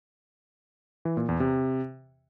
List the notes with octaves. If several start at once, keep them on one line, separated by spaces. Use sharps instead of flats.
E3
A#2
E2
C3